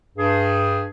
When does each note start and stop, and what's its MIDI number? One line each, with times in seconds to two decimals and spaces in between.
0.17 0.84 43
0.17 0.84 68